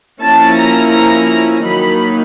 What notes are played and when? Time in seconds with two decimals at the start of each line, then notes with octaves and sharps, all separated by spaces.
0.22 F3 A#3 C#4 E4 A5
0.58 A#5
0.94 A#5
1.66 D#3 F#3 A#3 D#4 B5